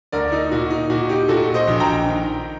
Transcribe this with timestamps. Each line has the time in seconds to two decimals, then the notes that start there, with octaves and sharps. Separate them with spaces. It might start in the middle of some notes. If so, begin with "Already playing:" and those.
0.12 D2 A#4 D5
0.32 D#4
0.51 A#2 F#4
0.70 D#4
0.90 A#2 F#4
1.09 D#4 G4
1.28 A#2 F#4 A4
1.54 C5 D#5
1.67 A#1
1.80 G5 A#5
2.06 D#3